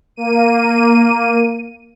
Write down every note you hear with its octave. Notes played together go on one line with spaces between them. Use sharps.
A#3 D#7